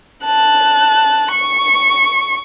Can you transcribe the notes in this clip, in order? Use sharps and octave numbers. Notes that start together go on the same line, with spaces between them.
A5 F#6
C#6